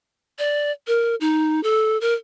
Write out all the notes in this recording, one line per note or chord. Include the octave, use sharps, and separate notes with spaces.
D5
A#4
D#4
A4
A#4